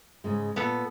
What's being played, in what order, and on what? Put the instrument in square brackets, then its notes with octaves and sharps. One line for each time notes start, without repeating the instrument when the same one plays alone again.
[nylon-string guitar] G#2 C#3 G#3
[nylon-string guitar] A#2 [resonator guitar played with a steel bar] B3 A4